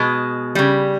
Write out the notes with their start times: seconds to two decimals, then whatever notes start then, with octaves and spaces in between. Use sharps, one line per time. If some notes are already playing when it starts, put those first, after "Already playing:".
Already playing: B2 G#3
0.55 C#3 G3